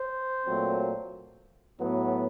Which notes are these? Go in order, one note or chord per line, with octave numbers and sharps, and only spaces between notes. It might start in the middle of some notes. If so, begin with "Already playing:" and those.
Already playing: C5
A#2 F#3 A3 C4
A2 F#3 B3